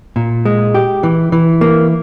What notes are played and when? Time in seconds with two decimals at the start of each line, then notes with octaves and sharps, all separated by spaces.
0.16 A#2
0.45 G#3
0.74 G4
1.03 E3
1.32 E3
1.61 A#3